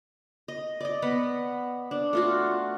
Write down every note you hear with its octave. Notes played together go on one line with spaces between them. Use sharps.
D#5
D5 D#5
B3 F#5 B5
D4
A3 F4 F#4